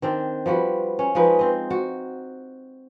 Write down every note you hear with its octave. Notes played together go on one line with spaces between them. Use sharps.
D#3 C4 D4
F3 G3 F#4 B4
C#4
F3 G#3 D#4 B4
C4 D#5
F#4